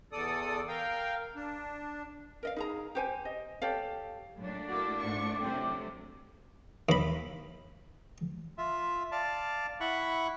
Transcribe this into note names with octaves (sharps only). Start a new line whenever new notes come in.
E2 A4 D5 D#6
A#4 F5 G5
D4
A#4 D#5 F5
D#4 G#4 A#5
G4 C5 G#5
D#5
G4 A4 C#5 F5
A#2 F#3 A3 D4
A#3 E4 F#4 D6
G#2 C#6
A2 C3 F#3 C4
D#2 B5
F4 E5
D5 F5 A5
E4 F#5 B5 C#6